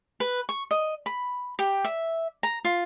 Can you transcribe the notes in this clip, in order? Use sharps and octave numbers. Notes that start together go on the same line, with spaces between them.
B4
C#6
D#5
B5
G4
E5
A#5
F4